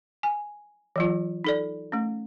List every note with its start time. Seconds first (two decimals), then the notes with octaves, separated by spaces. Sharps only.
0.23 G#5
0.96 E3 F#3 F4
1.44 D#4 A4 D5
1.92 A3 C#4